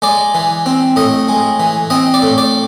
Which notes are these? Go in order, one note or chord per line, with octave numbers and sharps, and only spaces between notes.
G#3 D5
E3
C4
A2 D#5
G#3
E3
C4 D#5
D5
A2
D5